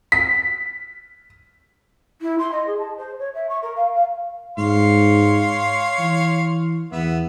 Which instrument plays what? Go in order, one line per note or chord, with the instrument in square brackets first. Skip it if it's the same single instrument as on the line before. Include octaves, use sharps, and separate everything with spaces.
[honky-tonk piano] B6
[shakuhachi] E4
C6
D#5
G#4
A5
C5
C#5
E5
C#6
A#4
F5
F5
[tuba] G#2 [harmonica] C#5 F5 C6
[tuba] E3
[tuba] E2 [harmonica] B3 E5